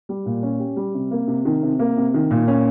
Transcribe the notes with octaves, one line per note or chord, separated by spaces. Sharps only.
G3
A#2
C#4
G4
G3
C3
A#3
C3
D#3
C3
A#3
C3
D#3
A#2
C#4